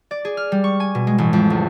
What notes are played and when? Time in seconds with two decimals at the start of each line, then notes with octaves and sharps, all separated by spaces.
0.11 D5
0.25 G#4
0.37 F6
0.52 G3
0.64 C#6
0.80 G#5
0.95 B2
1.07 G#3
1.18 A1
1.33 F2
1.50 C#2